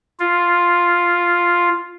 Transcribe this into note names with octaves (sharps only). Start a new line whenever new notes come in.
F4